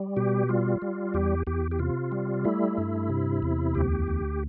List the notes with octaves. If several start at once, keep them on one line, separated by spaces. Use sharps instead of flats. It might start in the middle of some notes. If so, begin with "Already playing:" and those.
Already playing: G3
B2 G4
G3 F4
G3
E2 G4
E2 G4
G4
C3 F4
G3
A3 E4
G2
C3
E2
D2 G4
D2